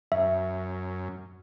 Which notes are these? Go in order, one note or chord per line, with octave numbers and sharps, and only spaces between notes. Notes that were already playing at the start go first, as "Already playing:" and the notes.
F#2 E5